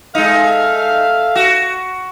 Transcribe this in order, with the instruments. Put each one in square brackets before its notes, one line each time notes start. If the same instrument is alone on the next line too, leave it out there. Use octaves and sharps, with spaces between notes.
[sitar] G#3 D#4 [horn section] A4 E5 F5
[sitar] F#4